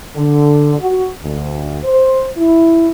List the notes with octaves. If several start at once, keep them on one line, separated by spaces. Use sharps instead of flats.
D3
F#4
D2
C5
E4